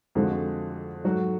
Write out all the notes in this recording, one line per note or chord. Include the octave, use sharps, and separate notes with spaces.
F2 D3 F3 G#3 F#4
G#2 F#3 A3 F#4